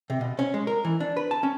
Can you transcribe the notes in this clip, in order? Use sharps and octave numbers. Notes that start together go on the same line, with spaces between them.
C3
B2
C#4
G#3
A#4
E3
D4
B4
A5
C#4